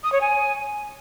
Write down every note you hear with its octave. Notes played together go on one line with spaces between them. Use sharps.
D#6
C#5
G#5